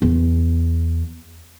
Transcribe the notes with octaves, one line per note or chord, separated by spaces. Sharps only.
E2